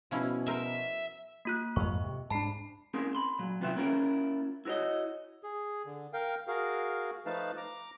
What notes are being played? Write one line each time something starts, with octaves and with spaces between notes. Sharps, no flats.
B2 F3 C#4 E4
A#4 C5 E5
A#3 F4 F#6
F2 G#2 D#5 C#6
C3
G#2 D4 A5 B5 C7
A#3 C4 C#4 E4 G#4 A#4
B5 C6
A#2 F#3
C3 D#3 F4 B4 C#5 E5
A#3 C#4 E4 F4 A#4
E4 F#4 A#4 C#5 D#5
G#4
D3
A#4 F5 G5
F#4 G#4 A#4 F5
F3 A3 D#4 B4 F5 A5
A#5 D6